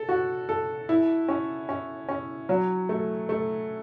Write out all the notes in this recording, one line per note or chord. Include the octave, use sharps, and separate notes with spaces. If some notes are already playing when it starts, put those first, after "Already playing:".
Already playing: A4
F#4
A4
E4
C#4
C#4
C#4
F#3
A3
A3